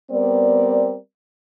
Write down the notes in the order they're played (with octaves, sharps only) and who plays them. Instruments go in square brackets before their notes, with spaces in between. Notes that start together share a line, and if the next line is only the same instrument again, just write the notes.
[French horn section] G3 B3 C4 A#4 D5